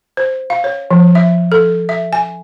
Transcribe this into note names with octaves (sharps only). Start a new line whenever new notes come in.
C5
F5
C#5
F3
E5
A4
E5
G#5